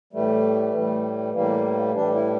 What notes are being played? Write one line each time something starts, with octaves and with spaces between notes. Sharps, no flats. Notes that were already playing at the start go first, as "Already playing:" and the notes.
A2 E3 G3 A3
A2 E3 G3
A2 E3 G3 A#3
A2 E3 G3 D4
E4